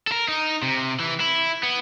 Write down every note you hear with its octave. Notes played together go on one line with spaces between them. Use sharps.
A4 A#4
D#4
C3
E3
E4
B3